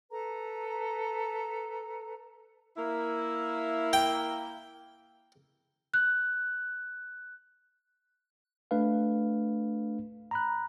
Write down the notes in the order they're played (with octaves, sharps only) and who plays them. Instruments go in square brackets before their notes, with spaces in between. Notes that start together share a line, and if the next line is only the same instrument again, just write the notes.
[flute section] A4 B4 A#5
[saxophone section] A#3 E4
[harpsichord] G5
[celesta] F#6
[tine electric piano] A3 D4 B4 F5
A#5 B5 F#6